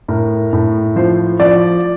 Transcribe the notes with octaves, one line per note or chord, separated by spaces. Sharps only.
A2 A#4
A2
F3 C5
F3 D5